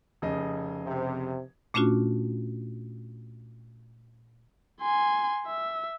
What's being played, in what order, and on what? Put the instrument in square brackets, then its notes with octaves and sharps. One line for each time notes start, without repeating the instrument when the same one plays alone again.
[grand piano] F1 C#3 D#5
[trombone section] C3
[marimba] A#2 A3 C#4 D4 F4 F#4
[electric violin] G#5 C6
E5